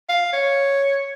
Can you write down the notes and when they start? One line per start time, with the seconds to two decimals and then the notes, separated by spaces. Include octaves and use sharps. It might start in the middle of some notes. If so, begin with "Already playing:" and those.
0.09 F5
0.33 C#5